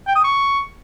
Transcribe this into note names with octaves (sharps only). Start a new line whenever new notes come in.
G5
D#6
C#6